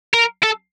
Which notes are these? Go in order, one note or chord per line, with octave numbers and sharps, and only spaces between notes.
A#4
A4